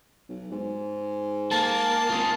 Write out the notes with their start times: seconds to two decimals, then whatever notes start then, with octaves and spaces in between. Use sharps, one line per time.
0.29 B1
0.51 G#2
1.52 A#3 A5
2.10 G#1 F4 G#4